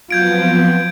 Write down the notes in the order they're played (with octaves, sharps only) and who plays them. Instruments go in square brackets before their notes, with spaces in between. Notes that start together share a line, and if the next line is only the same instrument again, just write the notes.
[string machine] F3 B3 C4 [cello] F#3 F4 [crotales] G6 G#6 D7